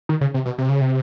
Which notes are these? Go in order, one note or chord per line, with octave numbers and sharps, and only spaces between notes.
D#3
C#3
C3
B2
C3
C#3
C3